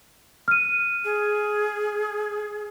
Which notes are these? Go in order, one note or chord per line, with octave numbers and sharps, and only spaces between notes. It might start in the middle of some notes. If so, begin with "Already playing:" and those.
F6 D#7
G#4